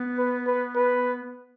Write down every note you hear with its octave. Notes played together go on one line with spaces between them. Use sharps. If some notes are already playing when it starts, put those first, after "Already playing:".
Already playing: B3
B4
B4
B4